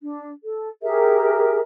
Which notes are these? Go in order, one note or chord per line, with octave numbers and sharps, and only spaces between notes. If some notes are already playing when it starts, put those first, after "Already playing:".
D4
A4
G4 G#4 A#4 E5